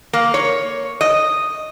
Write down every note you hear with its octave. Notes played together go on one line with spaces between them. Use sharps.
A#3
C#5
D#5